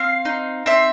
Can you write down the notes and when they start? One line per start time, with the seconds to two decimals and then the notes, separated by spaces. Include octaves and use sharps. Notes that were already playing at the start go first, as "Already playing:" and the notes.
Already playing: C4 F5
0.25 D#4
0.66 C4 E5